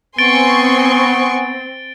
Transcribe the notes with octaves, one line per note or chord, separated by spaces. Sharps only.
B3 C4 G#5 C6 C#6 A6 D7 G7